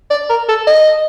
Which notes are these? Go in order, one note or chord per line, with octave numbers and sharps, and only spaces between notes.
D5
A#4
A4
D#5